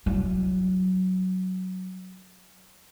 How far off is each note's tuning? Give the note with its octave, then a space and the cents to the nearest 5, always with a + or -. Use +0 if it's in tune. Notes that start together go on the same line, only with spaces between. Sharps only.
F#3 +5 E4 +30